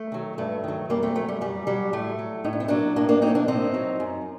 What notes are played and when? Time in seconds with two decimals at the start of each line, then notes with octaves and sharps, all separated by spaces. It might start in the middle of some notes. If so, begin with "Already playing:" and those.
Already playing: A3
0.12 D#3 F#3
0.38 G2 A3
0.64 D#3 F#3
0.90 F#2 G3 A#3
1.03 A3 C4
1.15 F#3 A3
1.29 G3
1.41 F#2 G3
1.67 F#3 G3
1.93 A2 A3
2.19 F#3
2.44 A2 D#4
2.53 D4
2.60 C4
2.68 F#3 A#3 D4
2.96 A2 A#3 D4
3.09 A#3 D4
3.22 F#3 C4 D#4
3.35 A#3 D4
3.48 A2 C4 D#4
3.74 F#3
4.00 F#2